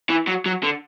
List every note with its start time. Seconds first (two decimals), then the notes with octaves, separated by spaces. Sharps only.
0.10 E3
0.28 F#3
0.46 F#3
0.63 D3